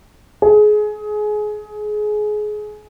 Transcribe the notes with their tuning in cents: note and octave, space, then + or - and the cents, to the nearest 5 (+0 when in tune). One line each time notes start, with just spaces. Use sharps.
G#4 +25